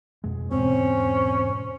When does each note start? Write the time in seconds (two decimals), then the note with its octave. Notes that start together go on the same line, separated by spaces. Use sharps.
0.24 F2 B2 G#3
0.51 E2 G#2 B2 C4 C#4 C5